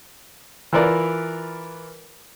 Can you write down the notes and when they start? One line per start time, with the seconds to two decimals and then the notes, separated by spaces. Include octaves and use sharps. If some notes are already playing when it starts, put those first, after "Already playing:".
0.73 E3 F4 A#4 B4 D5